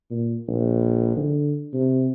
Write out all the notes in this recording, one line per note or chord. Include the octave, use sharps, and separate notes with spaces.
A#2
A#1
D3
C3